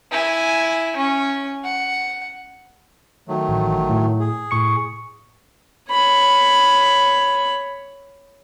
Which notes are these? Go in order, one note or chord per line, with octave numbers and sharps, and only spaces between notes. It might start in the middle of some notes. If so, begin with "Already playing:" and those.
E4 G#5
C#4
F#5
D#3 F#3 A3
A1
A2
G#4
A2 C#6 C#7
C#5 B5